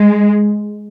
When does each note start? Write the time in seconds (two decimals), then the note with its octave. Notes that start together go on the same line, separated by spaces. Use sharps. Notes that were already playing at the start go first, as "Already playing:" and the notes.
Already playing: G#3